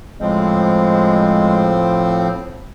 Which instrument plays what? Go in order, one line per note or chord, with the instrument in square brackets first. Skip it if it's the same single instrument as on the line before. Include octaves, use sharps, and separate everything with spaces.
[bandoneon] A2 F3 C4 [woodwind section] G#3